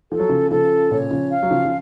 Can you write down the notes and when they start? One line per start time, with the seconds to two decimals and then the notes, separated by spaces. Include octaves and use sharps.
0.11 F3 A4
0.20 F#3
0.29 C#3 F3
0.51 C#3 F3 A4
0.91 A#2 C#3 C#5
1.11 C#3 F3
1.31 F5
1.43 F#3
1.51 C#3 F3
1.65 F3